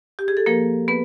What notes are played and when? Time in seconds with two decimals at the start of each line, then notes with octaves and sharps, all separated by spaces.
0.19 G4
0.28 G#4
0.37 A4
0.46 F3 A#3 A#4
0.88 B3 B4